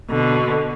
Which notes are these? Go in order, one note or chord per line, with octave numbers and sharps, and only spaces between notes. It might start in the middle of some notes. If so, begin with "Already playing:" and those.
B2 D3